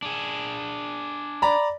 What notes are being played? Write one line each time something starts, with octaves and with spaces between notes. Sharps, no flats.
D4 G#4
D5 A#5 B5